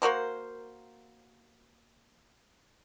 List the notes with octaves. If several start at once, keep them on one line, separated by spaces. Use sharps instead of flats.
A#3 F#4 A#4 C5